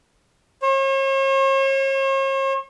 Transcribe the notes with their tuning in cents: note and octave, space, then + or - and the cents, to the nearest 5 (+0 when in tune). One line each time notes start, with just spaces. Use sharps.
C#5 -45